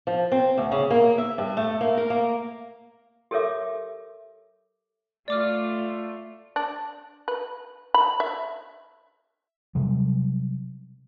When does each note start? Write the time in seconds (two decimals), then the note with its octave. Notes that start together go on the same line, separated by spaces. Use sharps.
0.07 F3
0.32 C4
0.58 D2
0.71 C#3
0.90 A#3
1.18 E5
1.38 G2
1.57 A3
1.81 A#3
1.97 A#4
2.10 A#3
3.31 G4 A4 A#4 C#5 E5 D6
5.28 A3 F4 D5 D6 F6
6.56 D4
7.28 B4
7.94 B5
8.20 E5
9.75 C3 F#3 G3